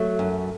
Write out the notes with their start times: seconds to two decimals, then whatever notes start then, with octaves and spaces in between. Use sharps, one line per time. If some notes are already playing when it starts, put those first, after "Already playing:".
Already playing: F#3 A3
0.19 F#2